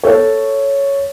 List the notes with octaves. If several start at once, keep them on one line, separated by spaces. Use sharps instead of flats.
A4 C#5